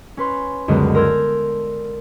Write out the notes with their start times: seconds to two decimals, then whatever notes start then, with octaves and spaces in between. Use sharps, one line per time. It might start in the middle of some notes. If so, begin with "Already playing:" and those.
0.17 C#4 B4 C6
0.68 C#2 F#2 D3 G#3 B3
0.95 A#4 C6 E6 G6 G#6